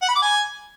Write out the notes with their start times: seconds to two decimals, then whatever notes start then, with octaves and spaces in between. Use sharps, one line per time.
0.02 F#5
0.09 B5
0.15 D6
0.22 G#5